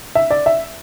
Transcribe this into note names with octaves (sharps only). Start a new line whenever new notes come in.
E5
D5
E5